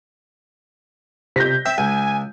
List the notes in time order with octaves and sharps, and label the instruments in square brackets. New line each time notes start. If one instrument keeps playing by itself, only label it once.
[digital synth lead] C3 [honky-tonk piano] G6 A#6 B6
[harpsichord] C4 [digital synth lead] E5
[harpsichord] C#2 [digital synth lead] G#5